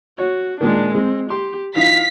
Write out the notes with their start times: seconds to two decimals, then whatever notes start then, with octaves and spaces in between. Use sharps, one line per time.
0.18 F#4 C#5
0.61 A#2 D#3 G#3 D4
0.95 G#3 C4
1.30 G4 C6
1.76 E3 D#4 F4 F5 B6